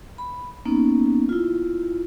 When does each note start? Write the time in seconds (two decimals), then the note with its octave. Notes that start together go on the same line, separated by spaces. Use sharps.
0.18 B5
0.65 A#3 B3 C#4 D#4
1.29 E4 F4